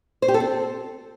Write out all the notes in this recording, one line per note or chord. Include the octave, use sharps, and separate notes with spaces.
C5
G4
A4
C4